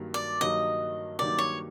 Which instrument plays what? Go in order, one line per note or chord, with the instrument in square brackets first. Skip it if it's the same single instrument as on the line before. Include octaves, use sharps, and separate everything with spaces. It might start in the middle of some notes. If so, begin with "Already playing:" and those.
Already playing: [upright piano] G2 D#3 F#3 A#3
[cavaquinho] D5
[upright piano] G2 D#3 F#3 A#3 [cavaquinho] D#5
[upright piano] G2 D#3 F#3 A#3 [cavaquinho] D5
[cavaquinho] C#5